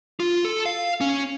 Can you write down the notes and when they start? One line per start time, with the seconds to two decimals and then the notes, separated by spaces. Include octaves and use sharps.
0.20 F4
0.45 A4
0.66 F5
1.01 C#4